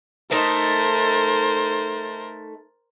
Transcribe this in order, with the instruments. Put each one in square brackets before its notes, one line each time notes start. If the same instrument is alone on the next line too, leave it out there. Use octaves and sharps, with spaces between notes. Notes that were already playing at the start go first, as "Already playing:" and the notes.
[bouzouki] A3 D#4 E5 [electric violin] A#4 C5